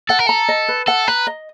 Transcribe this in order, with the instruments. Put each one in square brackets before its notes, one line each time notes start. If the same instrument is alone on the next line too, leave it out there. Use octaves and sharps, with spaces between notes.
[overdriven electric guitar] A4 [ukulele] F#5
[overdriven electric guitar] A#4
[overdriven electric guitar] A4 [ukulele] A#5
[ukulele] D#5
B4
[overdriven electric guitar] A4 [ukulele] F#5
[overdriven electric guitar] B4 [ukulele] A#5
[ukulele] D#5